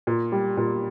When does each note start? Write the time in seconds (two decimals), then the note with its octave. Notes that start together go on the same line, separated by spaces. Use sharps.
0.07 A#2
0.32 G3
0.57 A#2